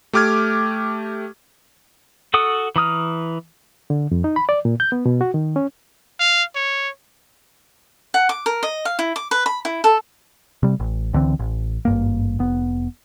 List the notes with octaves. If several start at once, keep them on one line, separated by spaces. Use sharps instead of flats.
A3 G4 D6 F6 G#6
F#4 A4 F#5 D#6
E3 A#5 D#6 F6
D3
F2
D#4
B5
D5
A#2
G6
B3
B2
F#4
D#3
C#4
F5
C#5
F#5
D6
A#4
D#5
F5
E4
D6
B4
B5
E4
A4
C3 G3
A1
C#2 D3 E3 C4
A1
G#1 G2 A#3
F1 B3